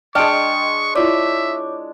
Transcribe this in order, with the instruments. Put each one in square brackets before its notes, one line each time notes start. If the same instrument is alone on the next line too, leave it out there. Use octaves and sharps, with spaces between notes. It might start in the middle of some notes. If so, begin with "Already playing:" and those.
[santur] G#3 D4 [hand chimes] D#5 G5 [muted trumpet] C#6 [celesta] F6 D7
[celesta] E4 F4 D5 [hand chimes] C#5 D6 [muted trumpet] E5